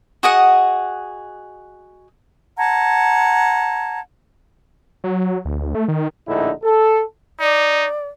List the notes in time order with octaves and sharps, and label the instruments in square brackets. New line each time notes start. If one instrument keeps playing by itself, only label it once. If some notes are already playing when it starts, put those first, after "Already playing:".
[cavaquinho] F#4 G#4 D#5 F#5
[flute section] F#5 A5 A#5 G#6
[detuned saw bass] F#3
D2
A3
D#3
[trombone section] A#1 A2 D3 D#4 E4
A4
[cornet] D#4 [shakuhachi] D5